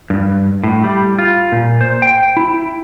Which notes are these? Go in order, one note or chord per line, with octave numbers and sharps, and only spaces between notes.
G2
A2
G3
F4
A#2
C5
G5
E4